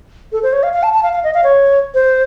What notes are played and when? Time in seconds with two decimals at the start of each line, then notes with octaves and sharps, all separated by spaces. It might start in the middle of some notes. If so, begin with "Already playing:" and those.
0.32 A4
0.43 C5
0.53 C#5
0.63 F5
0.73 F5
0.83 A5
0.93 A5
1.03 F5
1.13 F5
1.24 D#5
1.34 F5
1.44 C#5
1.94 C5